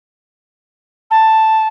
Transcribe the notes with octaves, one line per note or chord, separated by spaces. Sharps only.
A5